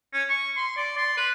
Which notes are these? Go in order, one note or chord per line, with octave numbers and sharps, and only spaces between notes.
C#4
C#6
C6
D5
C6
B4